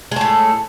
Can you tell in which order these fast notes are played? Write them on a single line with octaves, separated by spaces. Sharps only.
G#3 A3 A2